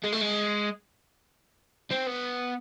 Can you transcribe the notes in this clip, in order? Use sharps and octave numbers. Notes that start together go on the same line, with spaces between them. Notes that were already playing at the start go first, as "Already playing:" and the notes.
G#3
A3
G#3
C4
B3